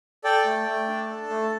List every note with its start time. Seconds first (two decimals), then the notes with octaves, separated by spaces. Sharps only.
0.24 A4 D5 G5
0.45 A3
0.67 A3
0.88 D4
1.08 A4
1.29 A3